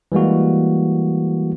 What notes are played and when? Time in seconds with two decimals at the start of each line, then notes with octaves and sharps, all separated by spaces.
0.12 E3 G3 G#3 A#3 F#4